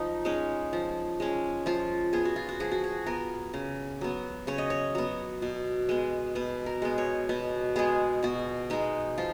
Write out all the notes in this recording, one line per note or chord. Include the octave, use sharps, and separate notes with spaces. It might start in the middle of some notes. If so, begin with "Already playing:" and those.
Already playing: F3 D#4
G#3 C#4 D#4
F3
G#3 C#4
F3 F4
B3 G#4
F#4
F4
F#4
F3 G#4
F#4
G#4
B3 A#4
C#3
F#3 B3
C#3 C#5
D#5
C#5
F#3 B3
B2
G#3 B3
B2 B4
A#4
G#3 B3
C#5
B2 B4
G#3 B3 G#4
B2 F#4
G#3 B3 D#4
F3 F4